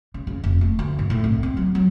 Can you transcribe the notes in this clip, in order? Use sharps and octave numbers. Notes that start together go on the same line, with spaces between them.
C#3
C#3
F1
A3
D2
G#2
A2
C2
C4
F#3
F#3